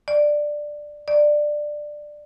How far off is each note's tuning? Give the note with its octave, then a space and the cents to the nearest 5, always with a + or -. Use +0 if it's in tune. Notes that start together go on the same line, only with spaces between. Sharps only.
D5 +10
D5 +15